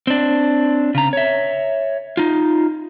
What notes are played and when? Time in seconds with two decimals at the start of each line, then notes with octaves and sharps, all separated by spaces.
0.07 C4 D4
0.95 C#3 A#5
1.13 C#5 E5
2.17 D#4 F4